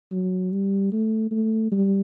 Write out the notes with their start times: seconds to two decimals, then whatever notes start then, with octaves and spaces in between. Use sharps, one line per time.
0.12 F#3
0.52 G3
0.92 A3
1.31 A3
1.72 G3